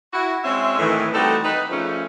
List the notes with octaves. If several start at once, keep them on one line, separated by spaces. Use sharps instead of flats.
E4 F#4
G#3 C4 C#4 F#4 E5
A2 D#3 E3
G3 A3 C4 D#4 F#4 A4
D#4 B4
C#3 F3 A3 C#4